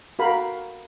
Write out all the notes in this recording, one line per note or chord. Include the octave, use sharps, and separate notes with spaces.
F#4 A4 A#4 F5 B5